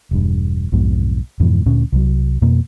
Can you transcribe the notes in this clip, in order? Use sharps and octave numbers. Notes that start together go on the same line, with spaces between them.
E1 G2
B1 F2 G#2 B2
F2 G#2 B2 E3
D2 A#2 C#4
C2 F#3
F2 B2 A#3